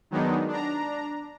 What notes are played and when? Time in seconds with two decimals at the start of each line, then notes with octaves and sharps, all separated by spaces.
0.11 D#3 F#3 G#3 B3 D4 D#4
0.48 D4 A#5